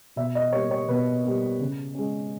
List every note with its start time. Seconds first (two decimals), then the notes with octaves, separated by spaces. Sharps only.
0.16 B2 E5
0.35 D#5
0.53 G3 A#3 C#5
0.71 C#5
0.88 B2 B4
1.24 G3 A#3
1.60 C#3
1.95 G#3 C#4